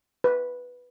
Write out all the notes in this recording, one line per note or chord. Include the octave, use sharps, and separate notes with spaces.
B4